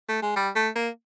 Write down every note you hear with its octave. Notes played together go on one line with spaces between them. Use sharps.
A3
G#3
G3
A3
A#3